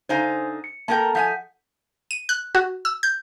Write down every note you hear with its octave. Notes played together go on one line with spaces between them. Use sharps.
D3 D#4 C5 F5 G#5
C#7
A#3 A4 A#4 G5 A5
F3 F5 F#5 G#5 G6 B6
D#7
F#6
F#4
E6
G6